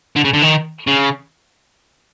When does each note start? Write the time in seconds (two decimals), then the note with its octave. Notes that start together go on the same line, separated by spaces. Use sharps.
0.16 D3
0.25 C#3
0.34 D3
0.42 D#3
0.87 C#3